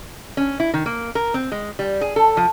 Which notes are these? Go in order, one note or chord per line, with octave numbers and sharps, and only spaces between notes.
C#4
E4
D#3
A#3
A#4
C4
G#3
G3
G#4
A4
F3